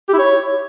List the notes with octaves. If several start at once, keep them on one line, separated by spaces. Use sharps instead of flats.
G4
E4
C#5